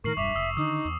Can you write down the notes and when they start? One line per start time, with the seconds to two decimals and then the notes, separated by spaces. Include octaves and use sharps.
0.04 A2 D#3 A#4 C#6 C7 F#7
0.17 E1 G2 E5 C#6 D6 F7
0.35 F1 D#6 E6 C7
0.57 D3 D#3 D#4 D#6
0.85 E2